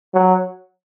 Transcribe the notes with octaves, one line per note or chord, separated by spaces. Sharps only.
F#3